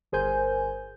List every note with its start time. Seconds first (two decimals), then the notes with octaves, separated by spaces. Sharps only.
0.12 G1 G#4 A#4 C5 G#5 G6